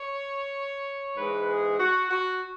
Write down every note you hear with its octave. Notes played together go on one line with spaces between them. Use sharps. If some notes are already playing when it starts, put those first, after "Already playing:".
Already playing: C#5
G#2 E3 G#3 B4
G#4
F#4
F#4